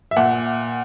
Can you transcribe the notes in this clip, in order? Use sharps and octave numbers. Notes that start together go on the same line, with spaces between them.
E5
A#2 F#5